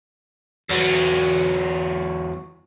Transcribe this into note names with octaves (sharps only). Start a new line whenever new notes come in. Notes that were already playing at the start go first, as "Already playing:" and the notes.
E2 F#3